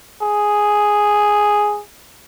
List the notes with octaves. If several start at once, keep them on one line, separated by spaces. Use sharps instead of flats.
G#4